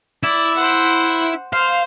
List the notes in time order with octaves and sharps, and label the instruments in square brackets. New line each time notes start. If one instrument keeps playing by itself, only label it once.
[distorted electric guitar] E4 [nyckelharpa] D5
[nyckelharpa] C5 F#5
[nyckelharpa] C5 [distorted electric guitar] F5